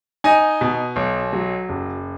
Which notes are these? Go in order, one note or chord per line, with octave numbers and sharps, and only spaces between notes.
D#4 D#5 G#5
B2
B1
F#3
F#1